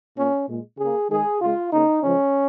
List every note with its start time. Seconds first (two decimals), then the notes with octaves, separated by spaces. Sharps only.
0.16 A#2 A#3 C#4
0.48 A#2 G#3
0.79 C#3 A#3 G#4
1.10 D#3 G#3 G#4
1.41 C#3 G#3 F4
1.72 C#3 A#3 D#4
2.03 C#3 F3 G#3 C#4